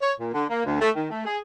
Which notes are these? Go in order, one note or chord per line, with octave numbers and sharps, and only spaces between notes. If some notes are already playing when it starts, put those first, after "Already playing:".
C#5
A#2
D3
A#3
D2
A3
D#3
A3
G#4